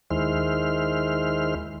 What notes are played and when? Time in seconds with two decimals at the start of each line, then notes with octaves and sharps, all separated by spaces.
0.10 D#2 D#3 G#3 E4 C5 F6